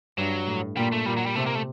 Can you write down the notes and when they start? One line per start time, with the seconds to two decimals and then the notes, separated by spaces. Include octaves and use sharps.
0.18 G2 F#3
0.47 A2
0.77 A#2 G3
0.92 A3
1.06 A#2 G3
1.17 F#3
1.26 G3
1.36 C3 A3
1.46 A#3
1.55 A3